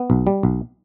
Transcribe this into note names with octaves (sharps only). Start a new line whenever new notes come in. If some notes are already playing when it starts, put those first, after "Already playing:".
Already playing: B3
B1
G3
B1